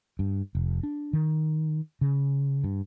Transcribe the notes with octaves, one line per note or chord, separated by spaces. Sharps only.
G2
F1
D4
D#3
C#3
G2